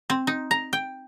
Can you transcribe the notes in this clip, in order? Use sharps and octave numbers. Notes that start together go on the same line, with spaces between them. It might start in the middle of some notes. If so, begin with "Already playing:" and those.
C4
D#4
A#5
G5